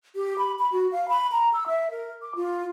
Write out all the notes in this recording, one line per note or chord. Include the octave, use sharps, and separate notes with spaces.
G4
B5
B5
F#4
F5
B5
A#5
E6
E5
A#4
D6
F4